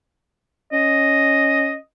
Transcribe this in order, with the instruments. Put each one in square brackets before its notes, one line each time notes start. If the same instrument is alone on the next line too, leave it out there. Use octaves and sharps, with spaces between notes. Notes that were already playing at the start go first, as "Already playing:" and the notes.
[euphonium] C#4 [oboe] D#5